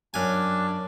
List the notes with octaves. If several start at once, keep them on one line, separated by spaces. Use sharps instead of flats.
F#2 D4 G#5